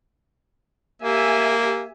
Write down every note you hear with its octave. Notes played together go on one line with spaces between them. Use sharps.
A#3 G4 E5 G#5